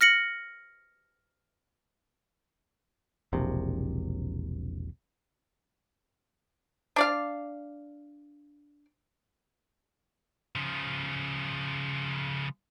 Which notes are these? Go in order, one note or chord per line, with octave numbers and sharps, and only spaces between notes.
F6 A#6 C#7 F#7
E1 A#1 C3
D4 D5 F5
C#3 F3